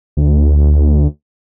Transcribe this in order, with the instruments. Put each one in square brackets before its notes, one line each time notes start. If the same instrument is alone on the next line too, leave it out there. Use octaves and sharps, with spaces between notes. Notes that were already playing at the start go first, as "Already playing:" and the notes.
[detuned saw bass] D2